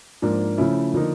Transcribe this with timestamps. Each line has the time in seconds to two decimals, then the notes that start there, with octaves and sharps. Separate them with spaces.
0.22 G#2 F3 A#3 D4
0.58 C#3 F3 A3 C#4 E4
0.94 D3 F3 A#3 D#4